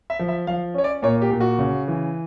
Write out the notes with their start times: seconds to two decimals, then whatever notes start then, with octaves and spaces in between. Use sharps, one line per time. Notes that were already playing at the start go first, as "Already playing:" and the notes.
0.10 E5
0.19 F3
0.28 E5
0.47 F3 F5
0.74 C#4 C#5
0.84 D5
1.02 A#2 C#5
1.22 G4
1.31 A#2
1.41 F#4
1.59 C#3
1.88 E3